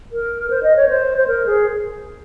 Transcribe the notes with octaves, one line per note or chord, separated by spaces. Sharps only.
A#4
C5
D#5
C#5
C5
C5
A#4
G#4